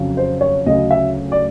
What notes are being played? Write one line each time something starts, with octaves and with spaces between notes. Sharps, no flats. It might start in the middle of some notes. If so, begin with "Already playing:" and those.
Already playing: F2 C#3 F#3
C5
C#5
D2 C#3 F#3 D#5
E5
D5